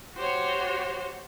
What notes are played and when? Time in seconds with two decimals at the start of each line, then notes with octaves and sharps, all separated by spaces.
0.14 F#4 G4 C5 C#5